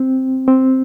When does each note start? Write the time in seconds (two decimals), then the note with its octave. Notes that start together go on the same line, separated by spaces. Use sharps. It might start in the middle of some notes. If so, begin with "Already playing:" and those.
Already playing: C4
0.48 C4